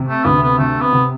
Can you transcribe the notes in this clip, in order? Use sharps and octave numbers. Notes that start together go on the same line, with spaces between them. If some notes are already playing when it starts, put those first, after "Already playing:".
Already playing: C3
A3
D2 B3
B3
C3 A3
B3
C3